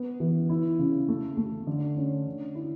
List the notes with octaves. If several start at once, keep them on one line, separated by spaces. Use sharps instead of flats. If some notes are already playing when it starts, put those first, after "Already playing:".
Already playing: B3
E3
E4
C#3
A3
A3
D3
C#4
D3
E4